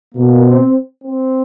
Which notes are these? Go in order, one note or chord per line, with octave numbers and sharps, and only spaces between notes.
B2 A#3
C4
C4